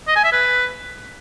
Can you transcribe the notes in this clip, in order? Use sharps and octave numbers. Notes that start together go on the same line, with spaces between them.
D#5
G#5
E5
B4